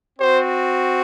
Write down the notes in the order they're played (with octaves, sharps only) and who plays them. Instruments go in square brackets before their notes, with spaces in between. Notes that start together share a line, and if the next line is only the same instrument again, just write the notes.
[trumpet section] C4 F#4 C5